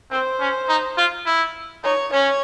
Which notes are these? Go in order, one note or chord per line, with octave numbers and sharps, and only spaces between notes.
C4 C5
C#4
D#4
F4
E4
D#4 C#5
C#4 C#5